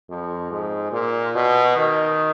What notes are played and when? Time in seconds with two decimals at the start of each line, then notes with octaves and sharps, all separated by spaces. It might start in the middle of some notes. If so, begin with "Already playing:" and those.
0.09 F2
0.51 G#2
0.92 A#2
1.35 B2
1.77 D#3